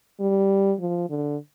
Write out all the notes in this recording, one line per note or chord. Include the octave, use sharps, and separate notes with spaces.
G3
F3
D3